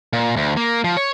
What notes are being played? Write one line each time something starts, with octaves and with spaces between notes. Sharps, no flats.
A#2
D2
A#3
F3
C#5